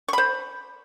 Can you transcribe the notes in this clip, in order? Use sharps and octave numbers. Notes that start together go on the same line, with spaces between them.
C5 B5 C#6